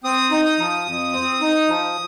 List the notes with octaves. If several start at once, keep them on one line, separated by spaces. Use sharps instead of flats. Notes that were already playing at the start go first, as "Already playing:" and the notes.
C4 D#6
D#4
D#6
F3
F2
C4
D#4
F3